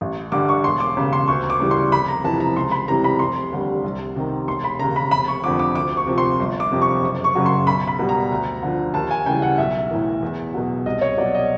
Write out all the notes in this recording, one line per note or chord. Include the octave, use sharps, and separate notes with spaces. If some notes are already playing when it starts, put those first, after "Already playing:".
A1
G2 D3 G3 D6
C#6
E1 C6
D6
D#2 C#3
C6
D2 C#6
D6
C#3 E3 G3
C6
F1 B5
A#5
F2 C3 E3 A5
A#5
C#2 C6
B5
C3 E3 G3 A#5
B5
F1 C6
D#2 D3 G3
C2
C3 D#3
E1 C6
B5
D#2 C#3 A#5
B5
F1 B5
C#6
F2 D3 F3 D6
D6
D2 D6
C#6
C3 F3
C6
G1
D6
F2 C3
C#6
F#1
C#6
F#2 C#3 F#3
C6
B1 B5
B5
B2 G3
A#5
D2
D3 F3
D#2 A5
G#5
C#3 E3 G3 G5
F#5
B1 E5
A2 E3
E2
B2 F#3
C2 D#5
C#5
B2 F#3 D5
D#5